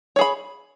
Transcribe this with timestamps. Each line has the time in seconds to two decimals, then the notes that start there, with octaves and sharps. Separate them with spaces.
0.16 C#5
0.19 G#4
0.21 B5